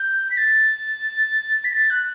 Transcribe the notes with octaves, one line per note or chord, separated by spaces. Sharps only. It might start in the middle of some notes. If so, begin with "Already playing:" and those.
Already playing: G6
B6
A6
B6
A6
F#6